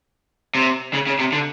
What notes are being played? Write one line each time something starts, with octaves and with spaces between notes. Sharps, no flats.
C3
C#3
C#3
C3
D3